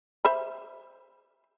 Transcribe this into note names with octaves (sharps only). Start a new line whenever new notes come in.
C5 E5 B5